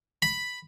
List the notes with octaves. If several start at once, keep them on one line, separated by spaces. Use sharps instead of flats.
B5